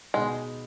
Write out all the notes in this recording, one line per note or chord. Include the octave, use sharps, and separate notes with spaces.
B2 G#3 B3 D#4 G#4